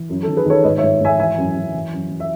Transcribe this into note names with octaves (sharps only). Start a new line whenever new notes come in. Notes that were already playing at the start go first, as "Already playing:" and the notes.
Already playing: E3
F#2
A4
D#3
G#4 B4
D#3 A4 C#5
G#2 B4 D#5
C#5 E5
G#2
G#2 E5 G#5
E3 E5 G#5
F#2
F#2
E3
F#2
E3
E5